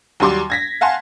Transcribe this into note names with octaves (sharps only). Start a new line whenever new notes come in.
D#2 F#3 G3 C6 D6
G#6 A#6 B6
F5 F#5 G#5 A5 C6